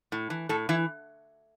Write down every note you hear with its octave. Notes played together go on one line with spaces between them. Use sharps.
A2
E3
A2 A4
E3 E4